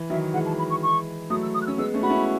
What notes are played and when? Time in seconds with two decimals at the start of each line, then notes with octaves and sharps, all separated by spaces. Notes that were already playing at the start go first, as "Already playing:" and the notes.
Already playing: E3
0.10 D#3 F#3 E5
0.33 E3 G#3 F#5
0.46 A5
0.58 B5
0.70 C#6
0.82 C#6
1.30 F#3 A3 D#6
1.42 E6
1.54 D#6
1.62 F#6
1.66 C#4 E6
1.78 G#3 B3 E6
1.94 A3 C#4
2.03 F#4 B5
2.10 C#4 E4